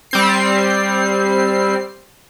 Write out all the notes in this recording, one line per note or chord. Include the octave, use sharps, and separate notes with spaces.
G3 C4 C7